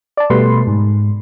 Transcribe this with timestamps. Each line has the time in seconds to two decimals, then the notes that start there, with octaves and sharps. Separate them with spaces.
0.17 D5 A5
0.30 B2 G3 A3 B4 C6
0.67 G#2